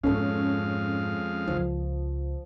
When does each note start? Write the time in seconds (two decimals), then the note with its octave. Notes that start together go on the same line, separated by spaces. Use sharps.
0.03 F2 G#2 B2 G#3 C#4 A4 F5
1.47 C#2 F3